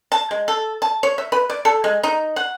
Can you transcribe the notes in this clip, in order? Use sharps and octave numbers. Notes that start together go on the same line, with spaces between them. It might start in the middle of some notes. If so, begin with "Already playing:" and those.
A5
G#3
A4
A5
C#5
E5
B4
D5
A4
G#3
D#4
F#5